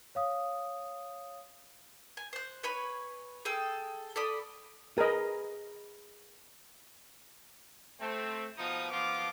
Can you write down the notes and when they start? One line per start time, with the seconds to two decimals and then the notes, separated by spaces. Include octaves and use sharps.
0.15 C#5 F5 D#6
2.17 G#5
2.33 C5 F#6
2.63 B4 C#5 G#5 B5
3.45 G#4 A4 G5 E6
4.16 A4 D5 B5 D#6
4.98 G#4 A#4 B4 D#5
8.00 A3 C4
8.58 B2 F3 D#4 D#6
8.91 F3 B3 F4 D6